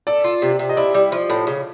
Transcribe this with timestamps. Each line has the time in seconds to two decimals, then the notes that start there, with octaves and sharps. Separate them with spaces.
0.07 A4 D5
0.24 F4
0.42 C3
0.59 C3
0.69 D#5
0.77 E4 D5
0.95 G3
1.12 F3
1.30 A2
1.47 C#3